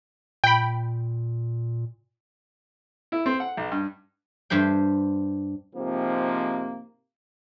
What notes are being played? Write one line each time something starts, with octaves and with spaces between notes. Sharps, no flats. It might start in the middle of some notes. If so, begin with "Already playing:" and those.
A#2 G5 B5
E4
C4
F#5
B1
G2
G2 G3 C5 G5
G#2 C3 F3 A#3 C4